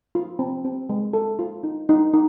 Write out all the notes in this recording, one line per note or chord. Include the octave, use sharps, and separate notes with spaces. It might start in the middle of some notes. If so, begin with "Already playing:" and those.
F4
C4
C4
G#3
A4
F4
D#4
D#4
D#4